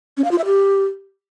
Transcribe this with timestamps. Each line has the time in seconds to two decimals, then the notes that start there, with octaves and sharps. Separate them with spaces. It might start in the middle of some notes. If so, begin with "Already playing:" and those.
0.17 C#4
0.24 F5
0.31 F4
0.38 E5
0.45 G4